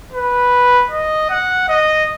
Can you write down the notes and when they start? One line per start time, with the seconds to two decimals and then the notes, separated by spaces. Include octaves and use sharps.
0.13 B4
0.91 D#5
1.30 F#5
1.69 D#5